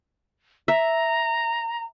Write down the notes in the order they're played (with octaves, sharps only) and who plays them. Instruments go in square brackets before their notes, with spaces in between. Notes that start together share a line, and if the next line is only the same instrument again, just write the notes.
[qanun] E5 [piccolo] A#5